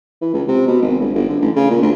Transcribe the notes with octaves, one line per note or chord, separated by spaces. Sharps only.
E3
C#2
C3
B2
G#1
G1
G1
D3
A1
C#3
A#2
D2